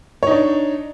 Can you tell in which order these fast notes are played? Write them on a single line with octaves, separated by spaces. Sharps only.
C#5 D#4 D4